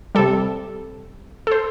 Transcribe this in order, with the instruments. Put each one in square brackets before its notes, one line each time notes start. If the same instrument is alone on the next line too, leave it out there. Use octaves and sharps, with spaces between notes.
[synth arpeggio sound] C3 G3 A4
A4
C5